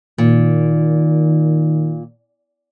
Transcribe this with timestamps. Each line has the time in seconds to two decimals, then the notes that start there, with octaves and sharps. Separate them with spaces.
0.18 A#2 D#3